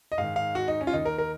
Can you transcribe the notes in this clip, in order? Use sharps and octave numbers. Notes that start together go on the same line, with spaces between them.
D#5
G#2 D#3 F5
F5
F#4
D#4
C#4
F4
D#2 D#3 D#4
A#4
A#4